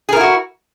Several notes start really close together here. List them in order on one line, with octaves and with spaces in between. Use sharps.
G#4 A#4 E4 F#4